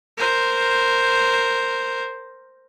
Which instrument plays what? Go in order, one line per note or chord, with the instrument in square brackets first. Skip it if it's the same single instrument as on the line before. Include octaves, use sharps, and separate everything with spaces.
[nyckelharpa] A#4 C5